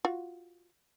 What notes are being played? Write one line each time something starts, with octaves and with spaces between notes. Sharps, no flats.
F4 F#4